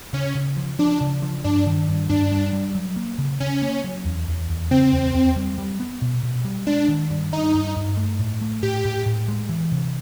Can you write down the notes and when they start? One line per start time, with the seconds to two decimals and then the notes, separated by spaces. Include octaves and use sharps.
0.13 C#3 C#4
0.35 C#3
0.57 F3
0.79 F3 D4
1.01 C#3
1.22 F3
1.44 G2 D4
1.66 D#3
1.88 G2
2.09 G2 D4
2.31 G3
2.53 G3
2.75 F#3
2.96 A#3
3.18 C#3
3.40 C#3 C#4
3.62 A#3
3.84 F#3
4.05 E2
4.28 E2
4.49 E2
4.71 C#3 C4
4.93 E2
5.14 E2
5.36 G3
5.58 G3
5.80 B3
6.02 B2
6.23 B2
6.44 G3
6.67 G#3 D4
6.89 D#3
7.10 G2
7.32 G2 D#4
7.55 G2
7.76 G2
7.97 A3
8.19 A2
8.41 A3
8.62 A2 G4
8.85 A2
9.06 A2
9.28 G#3
9.49 E3
9.72 C3